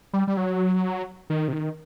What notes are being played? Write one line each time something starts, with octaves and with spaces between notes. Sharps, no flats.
G3
G3
F#3
D#3
C3
D#3